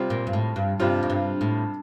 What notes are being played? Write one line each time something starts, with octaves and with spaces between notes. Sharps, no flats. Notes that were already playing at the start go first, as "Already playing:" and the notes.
Already playing: C3 G3 C4 F4
A#2
G2
A2
G2
G2 C3 G3 C4 F4
F2
G2
A2